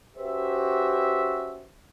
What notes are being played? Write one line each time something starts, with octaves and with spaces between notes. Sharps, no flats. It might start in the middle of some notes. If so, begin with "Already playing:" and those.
C#4 F#4 G4 B4 C5 E5